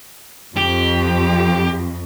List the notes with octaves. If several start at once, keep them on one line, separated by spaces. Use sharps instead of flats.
F2 G4